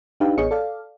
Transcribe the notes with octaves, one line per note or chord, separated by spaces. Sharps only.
D4 D#4 G4 B4 F5 G5
A1 B3 G#4 C#5 D#5 C#7
A4 D5 F5